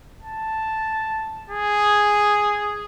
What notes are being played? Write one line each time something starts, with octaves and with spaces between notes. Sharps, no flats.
A5
G#4